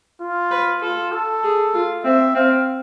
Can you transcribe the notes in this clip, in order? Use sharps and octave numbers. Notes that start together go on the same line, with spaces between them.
F4
B4
F4 A4
A4
G#4
F4
C4 E5
C4 F5